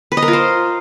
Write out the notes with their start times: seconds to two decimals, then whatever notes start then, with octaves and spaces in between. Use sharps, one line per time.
0.12 B4
0.17 D#5
0.22 A#4
0.28 F4
0.33 C5